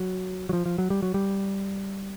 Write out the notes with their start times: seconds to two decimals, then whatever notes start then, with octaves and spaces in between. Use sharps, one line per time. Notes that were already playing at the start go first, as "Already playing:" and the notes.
Already playing: F#3
0.49 F#3
0.53 F3
0.66 F3
0.78 F#3
0.90 G3
1.02 F#3
1.14 G3